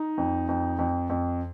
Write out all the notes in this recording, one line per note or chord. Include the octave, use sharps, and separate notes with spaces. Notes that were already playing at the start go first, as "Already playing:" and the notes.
Already playing: D#4
F2
F2
F2
F2